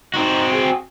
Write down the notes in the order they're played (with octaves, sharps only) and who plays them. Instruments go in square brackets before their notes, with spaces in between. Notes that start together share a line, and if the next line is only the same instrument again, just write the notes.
[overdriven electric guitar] C4 F#4 [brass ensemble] D#4
[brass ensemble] G#4 G5